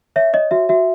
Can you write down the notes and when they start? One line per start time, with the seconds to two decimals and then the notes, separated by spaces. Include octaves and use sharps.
0.16 C#5 E5
0.34 C#5 D#5
0.51 F#4 E5
0.69 F#4 E5